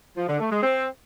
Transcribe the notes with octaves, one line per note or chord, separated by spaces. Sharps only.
F3
D3
A3
G#3
C4